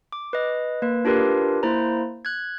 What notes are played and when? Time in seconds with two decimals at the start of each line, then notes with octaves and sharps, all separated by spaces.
0.12 D6
0.33 B4 D#5
0.82 A#3 B4
1.05 D4 F4 G4 A#4 B4
1.63 A#3 E4 C5 A#5
2.25 F#6 G#6